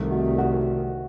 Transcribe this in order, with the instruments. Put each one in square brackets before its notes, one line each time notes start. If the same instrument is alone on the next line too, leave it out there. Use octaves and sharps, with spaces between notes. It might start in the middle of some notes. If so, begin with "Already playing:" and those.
Already playing: [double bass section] C2 C3 D#3 A3
[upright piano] F#4
F#4